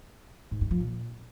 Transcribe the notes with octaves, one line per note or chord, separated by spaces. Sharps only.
G#2
G2
F3
A#2